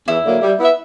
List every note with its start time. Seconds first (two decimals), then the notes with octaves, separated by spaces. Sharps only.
0.08 E2 E4
0.25 D3 F#3 A#3
0.42 G3
0.58 B3 E4 B4 E5